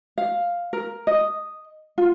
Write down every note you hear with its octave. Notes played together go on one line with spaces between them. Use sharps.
F5
A#4
D#5
F4